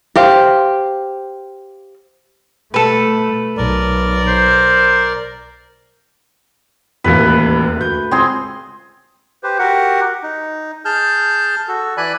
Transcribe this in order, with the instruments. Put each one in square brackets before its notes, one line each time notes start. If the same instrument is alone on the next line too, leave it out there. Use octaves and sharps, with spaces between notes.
[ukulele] G4 C5 F5
[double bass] B2 A3 [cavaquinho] A4 B4
[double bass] B1 [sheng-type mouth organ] A#4 D5
[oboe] C5
[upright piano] E1 A1 D#2 [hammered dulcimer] B4
[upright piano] D2 G6
[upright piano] C#2 [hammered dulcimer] C4 G#4 C6
[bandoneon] G4 B4 C5
F#4 G4 A#4 F#5
D#4
G#4 A5 F6 G6
F#4 A4
E3 D5 G#5 B5 F#6